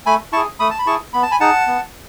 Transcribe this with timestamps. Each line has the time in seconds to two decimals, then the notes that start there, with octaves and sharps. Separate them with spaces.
0.06 A3 G#5 B5
0.33 E4 A5 C#6
0.37 G#4
0.60 A3 B5 D#6
0.70 A5
0.79 B5
0.86 E4 G#4 A5 C#6
1.13 B3 B5
1.23 A5
1.31 G#5 B5
1.40 D#4 G#4 F#5 A5
1.67 B3